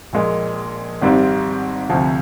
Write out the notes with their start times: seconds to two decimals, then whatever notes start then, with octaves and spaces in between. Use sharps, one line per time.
0.13 A#1 A#2 G#3
1.02 G#1 G#2 G3 C4
1.89 D2 C3 F3